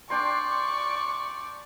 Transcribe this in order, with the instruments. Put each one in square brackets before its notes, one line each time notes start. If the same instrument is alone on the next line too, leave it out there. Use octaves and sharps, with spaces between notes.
[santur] D4 G5 C6 [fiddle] D5 [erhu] C#6